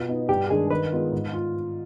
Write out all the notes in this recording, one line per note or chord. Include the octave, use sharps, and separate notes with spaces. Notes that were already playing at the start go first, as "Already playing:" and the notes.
Already playing: B2 F4
B3 D#4
G2 G4
D#3 G#3 D4 G#4
D#3 B4
G#3 B3 F4
G#2
F4